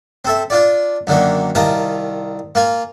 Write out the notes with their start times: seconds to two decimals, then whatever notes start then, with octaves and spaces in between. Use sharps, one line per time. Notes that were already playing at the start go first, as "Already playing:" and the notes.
0.25 C4 A4 E5
0.50 D4 F4 D5
1.07 F#2 D3 D#3 A#3
1.55 C2 D#3 F4 A5 A#5
2.55 A#3 F4 G#5